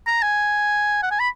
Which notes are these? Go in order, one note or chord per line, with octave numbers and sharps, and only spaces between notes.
A#5
G#5
F#5
G#5
B5